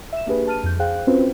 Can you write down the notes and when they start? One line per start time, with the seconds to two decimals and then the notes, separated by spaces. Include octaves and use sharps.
0.12 E5 E7
0.27 A#3 D4 G4 G#4 B4
0.46 B4 A5 F6 D#7
0.63 F2 G6
0.79 G#4 C5 F5 G5 F#6
1.07 C4 C#4 F4 F#4 B4 C5